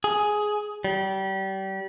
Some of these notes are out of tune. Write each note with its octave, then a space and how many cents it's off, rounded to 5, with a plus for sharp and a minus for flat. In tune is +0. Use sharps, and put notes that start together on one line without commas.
G#4 +10
G3 -30